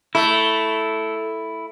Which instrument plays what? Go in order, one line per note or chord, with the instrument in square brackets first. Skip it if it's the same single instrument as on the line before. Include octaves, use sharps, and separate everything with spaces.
[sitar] A3 [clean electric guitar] E4